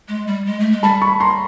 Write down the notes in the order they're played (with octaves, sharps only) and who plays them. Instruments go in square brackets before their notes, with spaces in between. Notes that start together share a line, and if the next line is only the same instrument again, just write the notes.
[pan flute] G#3
G3
G#3
A3
G#3
[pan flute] G3 [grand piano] A5 B5
[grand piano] B5 C#6
A#5 C6